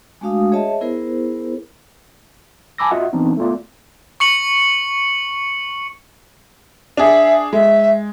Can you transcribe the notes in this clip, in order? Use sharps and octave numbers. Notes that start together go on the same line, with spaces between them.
G#3 A3 D4 F#4 F5 D#6
G#4 C#5 D#5 E5 A5
B3 E4 G#4 A#4 C5
G#5 A5 B5 D6 E6 A#6
F4 F#4 D#5 E5 F#5
E3 B3 C4 D4 D#4
A3 B3 F4 D5
C#6 C#7 F#7
D4 G#4 E5
G#3 E5